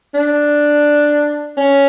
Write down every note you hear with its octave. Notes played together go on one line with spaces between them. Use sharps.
D4
C#4